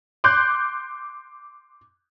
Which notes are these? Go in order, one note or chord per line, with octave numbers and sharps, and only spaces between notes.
C6 D6 F#6 G6